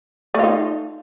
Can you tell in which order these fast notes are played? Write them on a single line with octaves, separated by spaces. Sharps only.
A3 F4 D#4